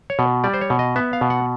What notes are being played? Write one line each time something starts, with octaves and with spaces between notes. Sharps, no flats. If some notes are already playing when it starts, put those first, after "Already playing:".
C#5
B2
G3 D5
C5
C#5
B2
D#5
B3 E5
F5
B2
F#5